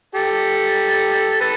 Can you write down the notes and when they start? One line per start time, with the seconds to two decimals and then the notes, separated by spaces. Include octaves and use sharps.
0.15 G4 A4
1.41 A4 B4